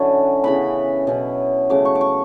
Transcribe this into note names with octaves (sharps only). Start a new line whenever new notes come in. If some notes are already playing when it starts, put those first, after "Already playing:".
Already playing: D3 F#3 C#4 E4
C#3 E3 B3 B5
B2 F#3 C#4 E4
C#3 F#3 A3 D6
C#6
D6
C#6